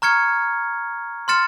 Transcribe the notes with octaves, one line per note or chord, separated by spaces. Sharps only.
A#5 C#6 F6 G#6 C#7
C6 F6 A6 C#7 E7